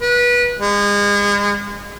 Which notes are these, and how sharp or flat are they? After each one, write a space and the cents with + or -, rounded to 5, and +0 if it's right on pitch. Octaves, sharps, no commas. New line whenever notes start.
B4 -25
G#3 -35